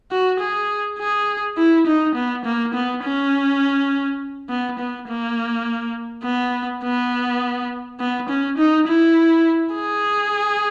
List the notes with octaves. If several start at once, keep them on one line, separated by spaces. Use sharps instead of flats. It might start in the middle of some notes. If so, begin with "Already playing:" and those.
F#4
G#4
G#4
E4
D#4
B3
A#3
B3
C#4
B3
B3
A#3
B3
B3
B3
C#4
D#4
E4
G#4